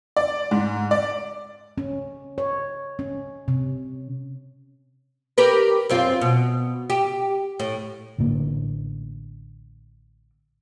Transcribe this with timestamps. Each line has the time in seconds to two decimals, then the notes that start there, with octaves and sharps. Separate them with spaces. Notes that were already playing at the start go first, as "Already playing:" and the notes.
0.17 D5
0.51 G#2
0.91 D5
1.78 C#4
2.38 C#5
2.99 C#4
3.48 C3
5.38 G4 A#4 B4
5.89 F#2 C4 F4
6.21 B2
6.90 G4
7.60 A2
8.18 A1 A2 D3 A#3